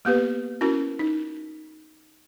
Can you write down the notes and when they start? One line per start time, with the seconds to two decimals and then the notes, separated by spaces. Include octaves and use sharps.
0.05 A#3 B3 G4 B4
0.61 C#4 E4 F#4 A#4
0.99 D#4